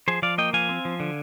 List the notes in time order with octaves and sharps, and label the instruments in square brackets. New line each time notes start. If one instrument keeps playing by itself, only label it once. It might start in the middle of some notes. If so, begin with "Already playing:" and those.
[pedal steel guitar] F3 G#4 C5
F3 D5 F5
A#3 D#5 G5
F3 F5 G#5
C4
F3
D3